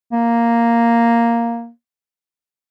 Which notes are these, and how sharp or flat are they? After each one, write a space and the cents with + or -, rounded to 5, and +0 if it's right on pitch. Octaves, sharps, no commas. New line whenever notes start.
A#3 +0